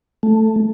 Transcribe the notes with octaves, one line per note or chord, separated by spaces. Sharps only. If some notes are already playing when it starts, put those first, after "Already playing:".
A3